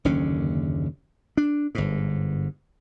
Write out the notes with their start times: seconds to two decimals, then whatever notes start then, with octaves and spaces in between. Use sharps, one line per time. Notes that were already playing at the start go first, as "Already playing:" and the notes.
0.05 F#1 D#2 D3 C#4
1.37 D4
1.75 G1 G#2